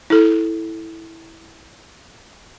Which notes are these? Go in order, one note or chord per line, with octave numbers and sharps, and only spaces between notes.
E4 A4